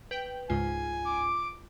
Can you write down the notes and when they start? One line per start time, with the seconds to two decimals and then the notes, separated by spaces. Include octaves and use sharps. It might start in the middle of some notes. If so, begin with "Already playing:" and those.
0.11 B4 G5
0.50 C#2 G#2 F4 G#5
1.05 D6